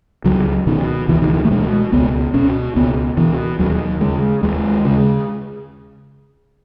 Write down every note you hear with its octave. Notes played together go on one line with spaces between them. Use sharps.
C#2 F#3
B2 D#3
C#2 E3
D#3
E3
A3
B2 G#3
C#2 B3
B2 C#4
C#2 B3
B2 E3
D#2 F#3
C#3 G#3
D#2 G#3
C#3